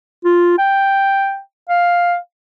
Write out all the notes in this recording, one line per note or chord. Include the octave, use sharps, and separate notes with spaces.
F4
G5
F5